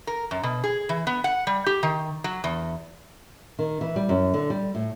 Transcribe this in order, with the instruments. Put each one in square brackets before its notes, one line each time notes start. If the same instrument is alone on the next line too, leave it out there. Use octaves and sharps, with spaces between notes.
[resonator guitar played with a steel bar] A#4
F#2
B2
G#4
E3
B3
F#5
G3
G4
D#3
F#3
E2
[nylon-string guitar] D#3
E3
G3
F#2
D3
G3
A2